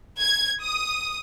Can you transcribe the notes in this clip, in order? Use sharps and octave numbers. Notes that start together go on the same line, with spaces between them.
G#6
D#6